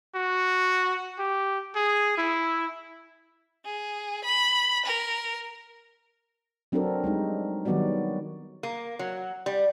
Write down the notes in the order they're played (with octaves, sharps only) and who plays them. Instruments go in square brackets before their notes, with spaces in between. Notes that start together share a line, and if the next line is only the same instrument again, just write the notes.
[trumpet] F#4
G4
G#4
E4
[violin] G#4
B5
A#4
[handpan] F#3 C4 D4 F#4 A4 A#4
G3 G#3 D#4
D#3 F#3 G3 B3 F#4 D5
[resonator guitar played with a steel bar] A#3
F#3
G3